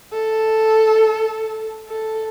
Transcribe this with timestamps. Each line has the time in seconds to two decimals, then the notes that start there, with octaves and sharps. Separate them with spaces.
0.13 A4
1.88 A4